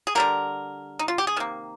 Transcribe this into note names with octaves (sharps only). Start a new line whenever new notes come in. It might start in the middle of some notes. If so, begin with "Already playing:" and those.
G#4
D3 G3 A#3 A#4
D#4
F4
G4
G#4
C3 D#3 A#3